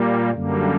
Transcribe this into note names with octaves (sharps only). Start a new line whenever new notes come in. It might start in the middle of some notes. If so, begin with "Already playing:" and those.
Already playing: A#2 G3 A#3
F#2 D3 G3 A#3